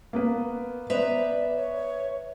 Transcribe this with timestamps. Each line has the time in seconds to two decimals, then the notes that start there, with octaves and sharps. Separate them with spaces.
0.13 A#3 B3 B4
0.90 B3 B4 C5 D5 E5 A#5
1.55 C#5